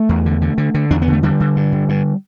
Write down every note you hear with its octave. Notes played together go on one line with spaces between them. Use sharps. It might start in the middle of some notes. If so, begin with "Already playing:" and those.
Already playing: A3
E2
D3
D3
D3
D3
E2 D4
B3
D3
A3
D3 G3
D3
G2
D3
G2